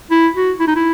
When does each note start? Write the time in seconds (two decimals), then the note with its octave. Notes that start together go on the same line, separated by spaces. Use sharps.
0.11 E4
0.35 F#4
0.60 E4
0.67 D#4
0.76 E4